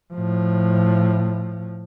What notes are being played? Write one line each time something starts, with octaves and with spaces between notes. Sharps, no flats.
A2 F3